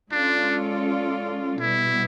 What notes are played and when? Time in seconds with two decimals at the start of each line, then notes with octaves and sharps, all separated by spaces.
0.11 G#3 C#4 D4 F4 A4 D5
1.60 B2 G3 B3 E4